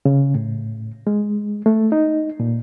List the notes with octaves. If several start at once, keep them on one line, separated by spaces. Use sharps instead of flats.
C#3
A2
G#3
A3
D#4
A#2